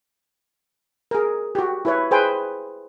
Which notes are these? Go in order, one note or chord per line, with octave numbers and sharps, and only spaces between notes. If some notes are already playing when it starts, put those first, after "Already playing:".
G#4 A#4
F#4 G4
E4 B4 C#5
G#4 B4 C5 G5 G#5